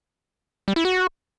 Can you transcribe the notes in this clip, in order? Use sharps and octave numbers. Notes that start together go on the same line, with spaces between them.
G3
E4
F#4